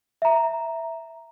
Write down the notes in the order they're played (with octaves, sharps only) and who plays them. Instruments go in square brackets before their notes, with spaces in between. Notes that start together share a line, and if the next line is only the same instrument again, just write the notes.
[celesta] E5 A#5